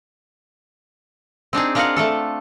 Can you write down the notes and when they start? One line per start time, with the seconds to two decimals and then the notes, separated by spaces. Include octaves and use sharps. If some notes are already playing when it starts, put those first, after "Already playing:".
1.53 C4 D4 D#4 G#4
1.75 D4 F4 A#4 D#5 F5 F#5
1.96 A3 D4 A4